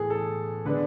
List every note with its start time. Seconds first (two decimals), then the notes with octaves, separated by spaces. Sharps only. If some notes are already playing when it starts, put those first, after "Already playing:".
Already playing: A2 E3 B3 G#4 A4
0.10 A4
0.65 D3 G#3 B3 D4 B4